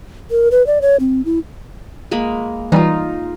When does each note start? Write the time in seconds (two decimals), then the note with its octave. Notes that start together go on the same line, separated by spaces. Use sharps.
0.31 A#4
0.51 B4
0.67 D5
0.82 C#5
1.00 C4
1.25 E4
2.11 G#3 A#3 B5
2.72 E3 G3 D#4 F4